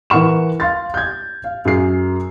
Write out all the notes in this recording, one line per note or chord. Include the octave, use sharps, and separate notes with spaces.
E3 A#4 F#5 C#6 E7
F5 C6 A6
G6 G#6
F5
F#2 G#4 C7